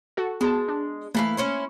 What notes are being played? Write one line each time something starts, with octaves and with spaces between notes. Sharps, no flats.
F#4 A4
G#3 B3 A5
D4
E3 A3 A#3 E4 F5
C#4 E4 C5